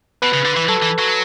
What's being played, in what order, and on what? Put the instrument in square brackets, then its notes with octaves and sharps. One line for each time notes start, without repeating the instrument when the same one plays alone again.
[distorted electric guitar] B2 [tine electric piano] B4
[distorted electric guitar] C#3
D3
E3
[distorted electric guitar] F#3 [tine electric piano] A4
[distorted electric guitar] E3
F#3